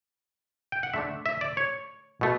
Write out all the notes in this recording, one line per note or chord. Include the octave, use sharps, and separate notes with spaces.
G5
F#5
D3 A3 D4 E5
E5
D5
C#5
B2 A3